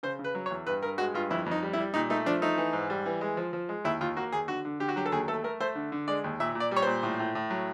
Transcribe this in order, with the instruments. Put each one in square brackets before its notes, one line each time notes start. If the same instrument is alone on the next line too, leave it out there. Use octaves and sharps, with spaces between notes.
[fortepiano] C#3 C5
C#3
B4
F#3
C#5
E2
G2 B4
G2 A#4
G#3 F#4
G2 F4
F2 E4
F2
D#4
G3
E4
G3
A#2 D#4
A3 D#4
F3 D4
A3 D#4
E3
G#2
G3
E3
G#3
F3
F3
G#3
D#2 E4
D#2 F4
A#3 F#4
D#2 G#4
D3 F#4
D3
D3 G4
F#4
F#3 G4
A4
D#2 G#4
A3 A4
A3 A#4
A3 C5
D3
D3
G#3 D5
D#2
A#2 E5
A#2
D5
G3
C#5
A#2 C5
A2
A2
A2
F#3